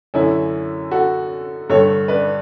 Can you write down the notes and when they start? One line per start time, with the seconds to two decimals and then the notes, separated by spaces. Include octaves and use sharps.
0.14 F#2 D3 C#4 E4
0.91 F#4 A4
1.70 G2 D3 A4 C#5
2.08 B4 D5